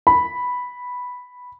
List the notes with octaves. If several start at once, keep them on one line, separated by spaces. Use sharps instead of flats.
B5